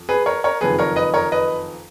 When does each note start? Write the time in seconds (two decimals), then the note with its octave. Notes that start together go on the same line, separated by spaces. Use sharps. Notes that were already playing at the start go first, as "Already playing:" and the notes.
Already playing: F2
0.09 G#4 B4
0.26 A#4 C#5
0.44 A#4 C#5
0.61 F#1 F2 D#3 G#4 B4
0.79 A#4 C#5
0.96 B4 D#5
1.14 A#4 C#5
1.32 B4 D#5